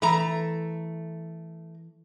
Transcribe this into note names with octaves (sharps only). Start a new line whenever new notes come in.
E3 A3 A#5 B5